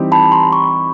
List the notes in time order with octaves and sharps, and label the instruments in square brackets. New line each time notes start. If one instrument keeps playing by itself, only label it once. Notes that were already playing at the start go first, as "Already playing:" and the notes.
Already playing: [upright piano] E3 G3 C4 D#4 G4
[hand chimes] A5 B5
A#5 C6
B5 C#6